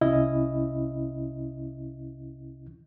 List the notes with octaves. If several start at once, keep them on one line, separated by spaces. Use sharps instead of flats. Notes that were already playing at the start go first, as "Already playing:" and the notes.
C2 C3 C#4 E4 D#5